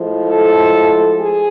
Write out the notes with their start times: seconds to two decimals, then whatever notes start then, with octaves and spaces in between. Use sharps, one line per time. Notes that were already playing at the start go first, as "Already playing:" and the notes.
Already playing: A2 F3 G#3
0.28 A4
1.19 G#4